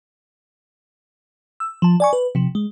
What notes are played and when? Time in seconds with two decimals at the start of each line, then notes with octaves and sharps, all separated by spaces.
1.60 E6
1.82 F3 A5
2.00 D5 G#5 C#6
2.13 B4
2.35 C3 F3
2.55 G#3